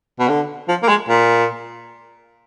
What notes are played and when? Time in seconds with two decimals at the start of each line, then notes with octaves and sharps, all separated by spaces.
0.19 B2
0.28 D3
0.68 F3
0.83 A#3
0.89 G#3
1.09 A#2